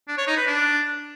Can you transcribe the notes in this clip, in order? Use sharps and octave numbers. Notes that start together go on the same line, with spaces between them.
D4
C#5
D#4
B4
D4